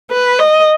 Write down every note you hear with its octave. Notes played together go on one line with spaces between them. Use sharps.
B4
D#5